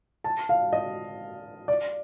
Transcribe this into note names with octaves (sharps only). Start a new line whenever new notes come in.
A5
F5
D#5
D5